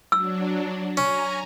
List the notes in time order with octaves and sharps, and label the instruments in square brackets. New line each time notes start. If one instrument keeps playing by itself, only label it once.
[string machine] F#3 D4 [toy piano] E6
[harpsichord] C#4 [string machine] G#5 A#5